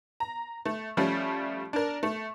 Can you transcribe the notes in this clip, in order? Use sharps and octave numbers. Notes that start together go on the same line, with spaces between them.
A#5
A3
F3 G3 A3 C#4
D4 A#4
A3